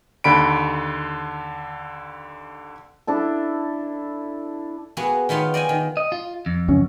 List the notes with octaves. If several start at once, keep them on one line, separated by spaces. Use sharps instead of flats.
D#2 D3 B5 D7
D4 E4 A4
A#3 B3 F#4 G#4
D#3 B3 D#4 F4 C#5
D5 D#5 G5 G#5
D#3
D#5
F4
F2
C#2 F#2 C#4